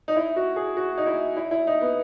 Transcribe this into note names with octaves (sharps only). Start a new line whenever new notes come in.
D#4
E4
F#4
G#4
F#4
D#4
E4
E4
E4
D#4
B3